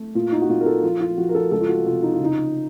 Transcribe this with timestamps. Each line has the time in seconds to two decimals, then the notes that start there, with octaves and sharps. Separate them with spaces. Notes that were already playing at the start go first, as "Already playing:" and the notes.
Already playing: A3
0.15 A#2 F4
0.32 D#4
0.41 F#4
0.49 A#2 F4
0.61 A#4
0.66 A4
0.83 F3 F4
1.01 F4
1.17 F3 F#4
1.29 A#4
1.35 A4
1.51 C#2 A4
1.61 F4
1.69 F#4
1.85 C3 F4
2.03 D#4
2.13 F4
2.20 C#3 D#4